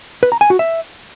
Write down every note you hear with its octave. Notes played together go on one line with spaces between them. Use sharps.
B4
A#5
G#5
F#4
E5